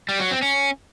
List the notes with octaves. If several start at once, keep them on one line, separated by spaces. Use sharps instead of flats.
G3
F#3
C4
C#4